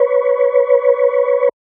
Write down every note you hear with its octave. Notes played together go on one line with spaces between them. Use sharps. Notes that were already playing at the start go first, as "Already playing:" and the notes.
Already playing: B4 C#5